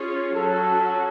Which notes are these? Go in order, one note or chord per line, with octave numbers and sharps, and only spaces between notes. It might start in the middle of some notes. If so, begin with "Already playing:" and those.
Already playing: C#4 F4 G#4 C#5
F#3 C#4 F#4 A4